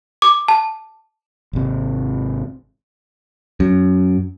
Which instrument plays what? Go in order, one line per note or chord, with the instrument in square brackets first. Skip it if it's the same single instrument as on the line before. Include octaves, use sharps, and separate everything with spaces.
[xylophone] D6
A5
[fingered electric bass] G#1 C3
[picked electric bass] F#2